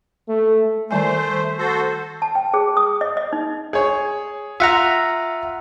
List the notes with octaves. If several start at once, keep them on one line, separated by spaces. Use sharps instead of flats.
A3
D#3 G3 A3 C5 G#5
F#4 A4 C5
A5
G5
G#4
D#6
D#5
D#5
D#4
G#4 C#5
F4 E5 F#5 A#5